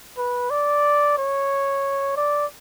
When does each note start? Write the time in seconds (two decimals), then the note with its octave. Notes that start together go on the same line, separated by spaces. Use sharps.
0.17 B4
0.50 D5
1.18 C#5
2.17 D5